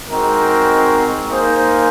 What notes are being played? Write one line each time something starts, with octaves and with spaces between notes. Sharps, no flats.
G#3 C4 D#4 F#4 A#4
A#3 D#4 G#4 C5